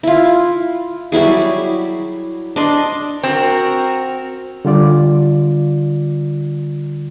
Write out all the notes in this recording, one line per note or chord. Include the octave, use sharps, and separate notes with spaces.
E4 F4
F#3 G3 E4 G#4
D4 D#5 C6
C4 F#4 A#4
D3 G3 F4 D5